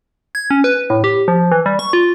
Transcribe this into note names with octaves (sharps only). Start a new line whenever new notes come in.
G#6
C#4
B4
A2
G4
F3
E3
G3
C#6
F4